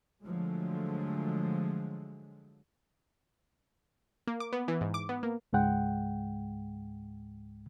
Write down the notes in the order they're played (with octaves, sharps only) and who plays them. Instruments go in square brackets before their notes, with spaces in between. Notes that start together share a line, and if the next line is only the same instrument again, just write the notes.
[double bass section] D3 F3 F#3 G#3 A3
[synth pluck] A#3
D6
B3
E3
G#2
D6
B3
A#3
[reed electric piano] C#2 G#2 G#3 F#5 G5